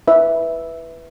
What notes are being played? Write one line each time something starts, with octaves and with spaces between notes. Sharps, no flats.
E4 B4 E5